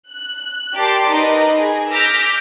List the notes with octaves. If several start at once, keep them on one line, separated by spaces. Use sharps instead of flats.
F#6
G4 A#4 D5 A5 C6 D6
D#4 A#4 B4 D#5
G#4
D6 E6 F6 G6 A#6 B6